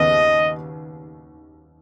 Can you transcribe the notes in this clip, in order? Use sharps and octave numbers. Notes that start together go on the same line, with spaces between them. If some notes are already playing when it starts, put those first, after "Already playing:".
Already playing: D#2 C#3 B3 D#5